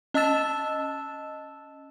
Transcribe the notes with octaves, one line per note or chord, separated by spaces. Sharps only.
C#4 D#5 A5 E6 A6 E7